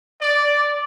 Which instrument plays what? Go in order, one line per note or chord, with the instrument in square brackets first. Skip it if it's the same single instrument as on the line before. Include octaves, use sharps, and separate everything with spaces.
[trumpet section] D5